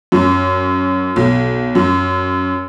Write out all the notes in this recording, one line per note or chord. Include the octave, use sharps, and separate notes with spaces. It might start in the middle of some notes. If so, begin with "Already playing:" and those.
F#2
B1
F#2